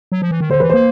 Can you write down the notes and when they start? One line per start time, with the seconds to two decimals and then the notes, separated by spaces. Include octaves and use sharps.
0.12 F#3
0.22 F3
0.31 E3
0.41 D#3
0.50 D3 C5
0.60 E3 B4
0.70 A#3 C5